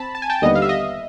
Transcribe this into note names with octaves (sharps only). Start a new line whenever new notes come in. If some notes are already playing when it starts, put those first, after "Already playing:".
Already playing: C4 A5 B5
A5
G#5
G5 A5
D#2 D3 G3 B3 D#5
F5
E5
D#5